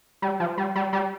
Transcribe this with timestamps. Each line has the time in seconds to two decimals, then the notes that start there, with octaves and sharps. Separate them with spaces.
0.22 G3
0.40 F3
0.58 G3
0.75 G3
0.93 G3